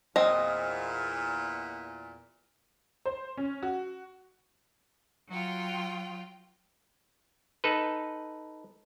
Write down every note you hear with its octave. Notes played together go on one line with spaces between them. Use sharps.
E2 A#2 C4 D#5
C5
C#4
F#4
F#3 F4 G5
D#4 A4 B4